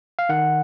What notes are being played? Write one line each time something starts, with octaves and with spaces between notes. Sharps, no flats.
F5
D#3 F#5